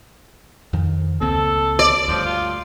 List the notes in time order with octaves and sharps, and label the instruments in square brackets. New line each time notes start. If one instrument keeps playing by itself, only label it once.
[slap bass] F2 D#3
[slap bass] C#2 A#3 C4 [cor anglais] A4
[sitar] D5
[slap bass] D2 G2 [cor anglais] F3
[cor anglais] F4